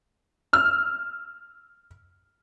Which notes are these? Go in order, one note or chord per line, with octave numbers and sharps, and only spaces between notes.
E6 F6